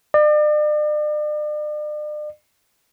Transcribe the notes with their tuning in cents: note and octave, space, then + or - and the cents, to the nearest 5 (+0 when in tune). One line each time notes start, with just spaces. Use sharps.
D5 +40